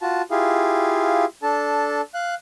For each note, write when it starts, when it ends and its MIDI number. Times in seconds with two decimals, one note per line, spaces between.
0.01 0.22 65
0.01 0.22 66
0.01 0.22 81
0.31 1.25 64
0.31 1.25 65
0.31 1.25 67
0.31 1.25 68
0.31 1.25 77
1.43 2.01 62
1.43 2.01 69
1.43 2.01 81
2.14 2.35 77
2.14 2.35 90